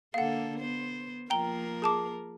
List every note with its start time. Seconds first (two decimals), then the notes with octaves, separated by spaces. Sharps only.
0.14 D3 A#3 A4 F5 F#5
0.59 B3 C5
1.30 F3 A#3 A#4 G5 A#5 G7
1.82 G#4 A5 D6